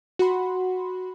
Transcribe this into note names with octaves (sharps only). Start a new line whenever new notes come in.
F#4 F#5 B5 C6